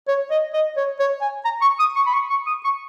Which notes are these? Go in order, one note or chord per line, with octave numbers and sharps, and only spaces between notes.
C#5
D#5
D#5
C#5
C#5
G#5
A#5
C#6
D#6
C#6
B5
C#6
C#6
D#6
C#6